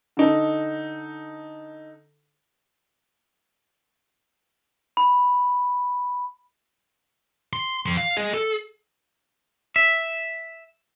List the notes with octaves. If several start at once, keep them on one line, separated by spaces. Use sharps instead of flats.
D3 D#4 A4
B5
C6
F2 C6
F5
G#4 D#5
A4
E5